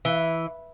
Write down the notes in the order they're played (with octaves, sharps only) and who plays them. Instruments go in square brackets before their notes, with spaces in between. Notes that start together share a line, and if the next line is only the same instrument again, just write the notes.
[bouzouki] E3